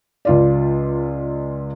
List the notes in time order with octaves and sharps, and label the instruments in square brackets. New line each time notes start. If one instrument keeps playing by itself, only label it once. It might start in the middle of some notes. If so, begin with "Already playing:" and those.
[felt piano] C#2 F4 D5